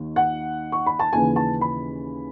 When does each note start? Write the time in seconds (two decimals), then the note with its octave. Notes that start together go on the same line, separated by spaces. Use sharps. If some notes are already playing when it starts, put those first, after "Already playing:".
Already playing: D#2 D#3
0.16 F#5
0.72 C#6
0.86 B5
0.99 A5
1.12 D#2 C#3 E3 G#5
1.36 A5
1.61 B5